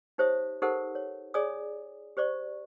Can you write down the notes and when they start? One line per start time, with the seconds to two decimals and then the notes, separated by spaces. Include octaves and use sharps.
0.18 D#4 G4 C5 C#5 E5 D#6
0.62 D#4 G4 A4 A#4 C5 F#5
0.95 C#5
1.34 G#4 C#5 D5 G#5 D#6
2.17 G4 C5 D5 C#6